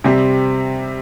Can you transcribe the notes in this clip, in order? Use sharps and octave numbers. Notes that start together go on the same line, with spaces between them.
C3 G3 C4